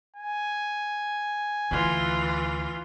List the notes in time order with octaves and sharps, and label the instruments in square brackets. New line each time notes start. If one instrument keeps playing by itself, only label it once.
[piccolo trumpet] G#5
[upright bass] D2 [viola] E3 F4